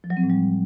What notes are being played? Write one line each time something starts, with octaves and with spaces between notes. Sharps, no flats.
F3
F#3
C4
A2
G3